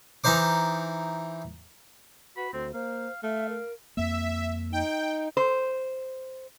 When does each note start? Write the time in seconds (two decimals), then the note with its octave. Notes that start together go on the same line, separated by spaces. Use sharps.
0.24 E3 D#4 C5 D6
2.37 F#4 B4 B5
2.53 D2 C4 C5
2.74 A#3 C5 F5
3.23 A3 E5 F5
3.49 A#4
3.97 F2 A#3 E5
4.73 D#4 G5
5.37 C5